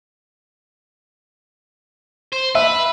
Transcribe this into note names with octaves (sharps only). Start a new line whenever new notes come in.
C5
B4 E5